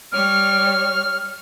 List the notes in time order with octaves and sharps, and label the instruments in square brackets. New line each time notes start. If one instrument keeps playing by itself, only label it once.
[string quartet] G3 C#5 [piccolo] F6